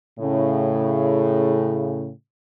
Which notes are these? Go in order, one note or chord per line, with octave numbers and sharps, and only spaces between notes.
A2 C#3